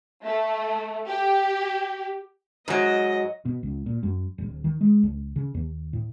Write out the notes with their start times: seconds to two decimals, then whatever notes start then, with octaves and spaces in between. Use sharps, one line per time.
0.25 A3
1.08 G4
2.68 G#2 F#3 D#5
3.45 B2
3.63 C#2
3.86 A#2
4.03 F#2
4.38 D1
4.64 D#3
4.81 G#3
5.03 C#2
5.36 C#3
5.54 D#2
5.93 A2